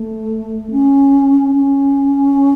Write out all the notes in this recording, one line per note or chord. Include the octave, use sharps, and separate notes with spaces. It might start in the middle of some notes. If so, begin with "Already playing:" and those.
Already playing: A3
C#4
C#4